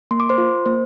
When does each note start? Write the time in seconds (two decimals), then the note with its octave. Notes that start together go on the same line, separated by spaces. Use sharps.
0.11 A#3 C6
0.20 D6
0.29 C5 C6
0.38 F4
0.66 A#3 C5